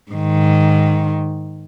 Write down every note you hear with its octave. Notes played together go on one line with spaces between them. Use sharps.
G#2 D#3